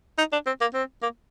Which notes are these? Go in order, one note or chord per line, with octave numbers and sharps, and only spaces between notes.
D#4
D4
C4
A#3
C4
A#3